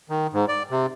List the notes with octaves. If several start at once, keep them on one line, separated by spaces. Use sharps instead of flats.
D#3
G#2
D5
C3